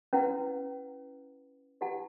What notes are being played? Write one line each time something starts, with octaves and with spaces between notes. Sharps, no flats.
C#4 E4 B4 F#5
E4 G4 B4 F#5 A5